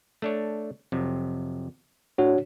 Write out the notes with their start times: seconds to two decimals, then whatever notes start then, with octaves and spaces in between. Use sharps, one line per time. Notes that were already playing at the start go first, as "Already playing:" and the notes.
0.22 A3 D4 C#5
0.92 F2 C3 F#3
2.18 A2 D4 F#4 C#5